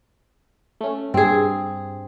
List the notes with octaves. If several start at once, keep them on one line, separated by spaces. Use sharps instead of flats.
A3 C#4
G2 C4 G#4